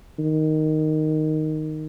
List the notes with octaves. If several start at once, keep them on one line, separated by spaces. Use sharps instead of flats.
D#3